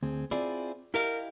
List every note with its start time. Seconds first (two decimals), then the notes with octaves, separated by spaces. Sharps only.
0.03 D2 C4 G#4
0.31 C4 E4 F4 G#4 D5
0.94 E4 G4 A#4 D#5 F5